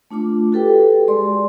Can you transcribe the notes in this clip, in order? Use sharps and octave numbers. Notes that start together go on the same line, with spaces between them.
A3 D4 F4 D6
F#4 G4 A4 B4 G5
G#3 G#4 D5 C6